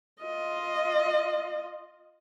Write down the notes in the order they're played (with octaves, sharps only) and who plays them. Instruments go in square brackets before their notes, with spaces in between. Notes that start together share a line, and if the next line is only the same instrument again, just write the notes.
[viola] F4 D#5